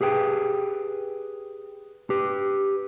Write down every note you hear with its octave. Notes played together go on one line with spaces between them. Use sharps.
G4 G#4 B4 G5
G4 B4